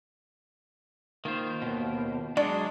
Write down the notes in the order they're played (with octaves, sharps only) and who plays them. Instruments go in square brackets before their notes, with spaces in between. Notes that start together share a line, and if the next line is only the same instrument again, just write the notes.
[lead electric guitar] D#3 [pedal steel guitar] A#3 F4 C5
[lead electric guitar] D#2 B2
[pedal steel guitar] F#3 C#6 D6 [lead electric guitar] G#3 [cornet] D4 [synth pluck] D5